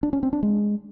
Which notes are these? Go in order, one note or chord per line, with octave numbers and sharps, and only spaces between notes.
D4
C#4
C4
D4
G#3